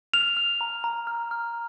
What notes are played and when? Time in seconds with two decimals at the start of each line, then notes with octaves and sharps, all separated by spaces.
0.14 F6 F7
0.37 F6
0.61 A#5
0.84 A#5
1.07 F6
1.31 F6